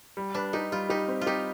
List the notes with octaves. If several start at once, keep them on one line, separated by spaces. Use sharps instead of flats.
G3
D4 B4
D#4 G4
G3 F4
D#4 G4
C4
F4
D#4 G4